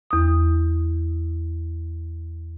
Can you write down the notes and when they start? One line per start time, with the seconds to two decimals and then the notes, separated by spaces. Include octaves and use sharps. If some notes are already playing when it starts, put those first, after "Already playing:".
0.11 E2 D#6